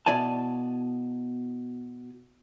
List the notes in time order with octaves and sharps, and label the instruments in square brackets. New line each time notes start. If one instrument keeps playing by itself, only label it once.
[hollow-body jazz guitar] B2 E4 D5 G#5 A5